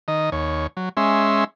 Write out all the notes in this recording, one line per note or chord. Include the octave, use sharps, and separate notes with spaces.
D#3 D#5
D#2 C#5
F#3
G#3 C#4 E5 C6